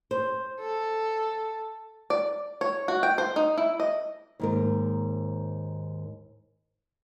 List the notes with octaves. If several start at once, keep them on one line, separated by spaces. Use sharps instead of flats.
C5
A4
D5
C#5
F#4
G5
C5
D#4
E4
D#5
D#2 G#2 A#4